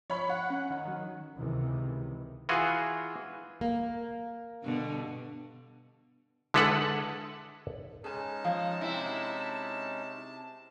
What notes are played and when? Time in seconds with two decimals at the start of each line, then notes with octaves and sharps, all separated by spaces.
0.10 F3 C#5 B5
0.29 F#5
0.50 C#4
0.71 D#3
0.85 D#3 F#3
1.37 C#2 C3 D#3 E3
2.49 E3 F4 F#4 G#4
3.61 A#3
4.63 G2 B2 D3
6.54 D3 G#3 E4 A4 B4 F#5
8.04 G#3 C#4 D#4 G#4 B4 G#5 A5
8.44 F3 F5
8.81 C3 C4 E4 D#5